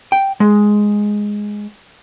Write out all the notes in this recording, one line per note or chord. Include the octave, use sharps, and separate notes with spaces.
G5
G#3